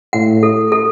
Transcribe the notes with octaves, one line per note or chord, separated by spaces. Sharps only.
A2 F#5
A4
A4